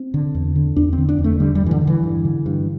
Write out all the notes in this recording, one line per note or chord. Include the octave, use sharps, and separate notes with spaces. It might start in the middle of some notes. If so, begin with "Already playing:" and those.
Already playing: C4
D3
E2
D3
E2 D4
C4
D3
D4
E2
A3
D3 G3
G3
G2
E3
D3
D3
E3
G2
D3
G2